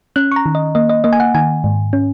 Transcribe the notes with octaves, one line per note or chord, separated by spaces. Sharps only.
C#4 F#6
C#6
A#5
D#3
D#5
A#3 D#5
D#5
A#3 D#5
G#5
F#5
D#3 G#5
G#2
C#4